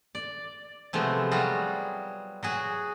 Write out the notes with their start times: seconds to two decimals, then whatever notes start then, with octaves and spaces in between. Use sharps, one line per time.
0.15 D5
0.93 C3 F3 G#3 A3 B3
1.31 F#3 G3 F4 F#4 G#4
2.43 F#3 F#4 G#4